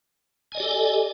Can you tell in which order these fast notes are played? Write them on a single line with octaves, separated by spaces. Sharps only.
G#5 D#5 D5 G4 A4